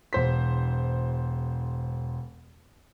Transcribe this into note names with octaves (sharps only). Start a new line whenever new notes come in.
E1 C5 B6